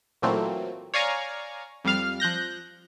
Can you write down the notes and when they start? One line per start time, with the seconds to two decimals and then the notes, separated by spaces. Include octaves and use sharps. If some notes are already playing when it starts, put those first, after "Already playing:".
0.22 A#2 E3 F#3 A3 A#3 C4
0.94 C#5 D5 F5 G#5 A#5 C#6
1.84 F2 G3 F5 F6
2.20 F3 F#6 G6 A#6